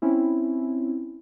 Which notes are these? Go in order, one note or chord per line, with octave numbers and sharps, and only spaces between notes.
C4 C#4 E4